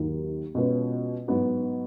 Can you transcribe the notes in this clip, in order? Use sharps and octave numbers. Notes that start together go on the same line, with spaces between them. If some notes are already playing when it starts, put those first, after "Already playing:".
Already playing: D#2 D#3 F#3 A#3 D#4
B2 G#3 C#4 F4 B4
G#2 F#3 B3 F#4